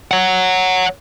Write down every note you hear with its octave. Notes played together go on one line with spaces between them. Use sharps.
C#5 F#5